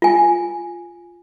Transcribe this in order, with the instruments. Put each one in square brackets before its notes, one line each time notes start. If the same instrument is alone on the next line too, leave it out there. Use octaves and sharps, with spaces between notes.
[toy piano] F4 G#5